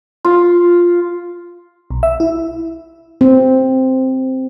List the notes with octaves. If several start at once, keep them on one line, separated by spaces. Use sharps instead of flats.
F4
B1
E5
E4
C4